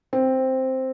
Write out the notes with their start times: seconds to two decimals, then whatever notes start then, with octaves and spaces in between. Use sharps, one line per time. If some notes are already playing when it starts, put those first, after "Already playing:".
0.13 C4